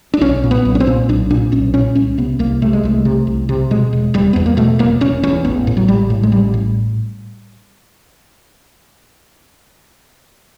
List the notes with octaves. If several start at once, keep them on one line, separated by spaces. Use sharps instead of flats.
D4
B1 C#4
A#2
B3
B1
C#4
C4
A#2
B1 D4
A#2 D4
B1 C#4
A#2 C#4
C2 C#4
C3 B3
C2 A#3
C3 A3
G#3
C2 A3
C3
C2
C3
B2 G#3
E1
E1 G3
E2 B3
A#3
B2 A3
E1 A#3
E1 C#4
E2 C#4
A1 B3
A2
F#3
A1 G3
A2
G#3
A1 G3
A2